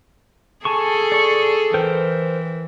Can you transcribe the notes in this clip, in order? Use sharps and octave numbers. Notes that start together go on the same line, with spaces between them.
G#4 A4 G#5 A5 C#6
D5 C#6
E3 A#4 C5 G5